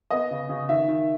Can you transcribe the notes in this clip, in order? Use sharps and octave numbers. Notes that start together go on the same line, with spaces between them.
B3 D#5
C#3
C#3
D#3 E5
D#3